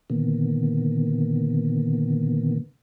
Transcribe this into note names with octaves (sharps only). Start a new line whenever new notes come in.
A#2 D3 D#3 A#3 B3